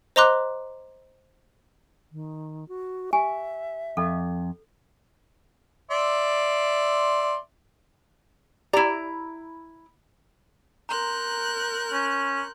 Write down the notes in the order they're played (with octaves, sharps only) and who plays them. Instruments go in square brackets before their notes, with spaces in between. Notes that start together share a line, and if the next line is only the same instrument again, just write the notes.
[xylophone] C5 D#5 A#5 C6 D6 F#6
[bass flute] D#3
F#4
[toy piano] G4 G#5 [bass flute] E5
[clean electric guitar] F2 [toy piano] A4
[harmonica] D5 E5 C6
[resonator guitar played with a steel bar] E4 A#5 [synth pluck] G4 D5
[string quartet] A#4 F#6 G6 [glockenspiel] A#5 C6
[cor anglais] C#4